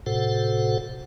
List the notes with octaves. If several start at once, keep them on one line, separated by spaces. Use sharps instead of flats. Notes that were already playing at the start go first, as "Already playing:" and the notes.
A2 C3 F#4 A4 C5 F#5